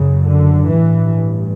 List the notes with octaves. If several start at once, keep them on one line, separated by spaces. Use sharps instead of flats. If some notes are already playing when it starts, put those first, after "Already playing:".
Already playing: F#1 F#2 C#3
D3
A1 G2 E3